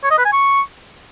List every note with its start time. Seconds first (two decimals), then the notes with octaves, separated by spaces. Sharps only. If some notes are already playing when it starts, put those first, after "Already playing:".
0.04 C#5
0.11 D#5
0.18 B4
0.25 G#5
0.32 C#6